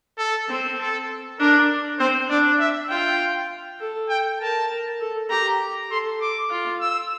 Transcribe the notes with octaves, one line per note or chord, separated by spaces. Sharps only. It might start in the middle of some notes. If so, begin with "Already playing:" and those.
A4
C4
A4
D4 A#4
C4 C5
D4 D5
E5
F4 G5
A4
G5
A#4 A5
A#4
A4
G4 A#5
A4 C6
D6
F4
E6